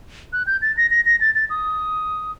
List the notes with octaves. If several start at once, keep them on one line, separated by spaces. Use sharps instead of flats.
F#6
G6
A6
A#6
A#6
A#6
A6
A6
D#6